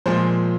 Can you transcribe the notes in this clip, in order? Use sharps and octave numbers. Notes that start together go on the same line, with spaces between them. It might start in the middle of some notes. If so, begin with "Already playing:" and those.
A#2 F3 G#3 C5